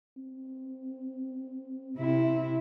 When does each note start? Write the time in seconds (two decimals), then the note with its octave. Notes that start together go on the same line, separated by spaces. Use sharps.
0.17 C4
1.97 C3 E4